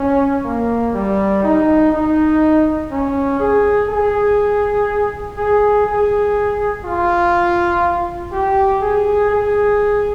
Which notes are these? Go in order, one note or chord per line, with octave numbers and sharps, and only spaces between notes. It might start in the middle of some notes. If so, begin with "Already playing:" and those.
Already playing: C#4
A#3
G3
D#4
D#4
C#4
G#4
G#4
G#4
G#4
F4
G4
G#4
G#4